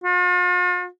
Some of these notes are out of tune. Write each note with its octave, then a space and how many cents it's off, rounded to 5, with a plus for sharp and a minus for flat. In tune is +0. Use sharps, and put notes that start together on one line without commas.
F4 +45